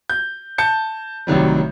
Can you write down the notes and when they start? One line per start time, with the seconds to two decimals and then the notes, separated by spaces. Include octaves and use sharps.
0.10 G6
0.58 A5 G6 C#7
1.27 A1 C3 D#3 F#3 G3